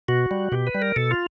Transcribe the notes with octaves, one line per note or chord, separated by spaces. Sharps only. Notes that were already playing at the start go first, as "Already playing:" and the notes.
B2 F#4
G3
B2 G4
B4
G3
A#4
B2 A4
F4